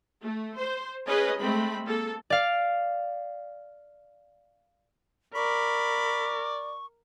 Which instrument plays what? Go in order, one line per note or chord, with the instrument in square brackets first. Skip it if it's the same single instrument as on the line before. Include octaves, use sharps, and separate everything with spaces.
[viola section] A3
C5
C#4 G#4 B4 D#5 G#5
G#3 A3 C4 B5
A#3 A4
[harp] D5 F5
[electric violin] A#4 [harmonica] D5 [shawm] B5 [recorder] C#6